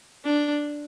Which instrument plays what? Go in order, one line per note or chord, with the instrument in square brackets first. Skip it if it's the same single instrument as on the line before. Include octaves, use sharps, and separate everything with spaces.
[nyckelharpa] D4